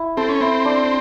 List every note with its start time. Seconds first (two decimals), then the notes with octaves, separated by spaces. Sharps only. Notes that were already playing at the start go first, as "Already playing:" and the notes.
Already playing: E4
0.17 C4 A4
0.29 C#4
0.41 C4 E4
0.65 D4